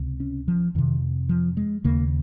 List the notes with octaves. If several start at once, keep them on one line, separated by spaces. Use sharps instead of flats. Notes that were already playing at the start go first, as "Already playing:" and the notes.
Already playing: C#2 C3
C#4
F3
F2 C3 D#3
F3
G#3
D#2 C#3 A#3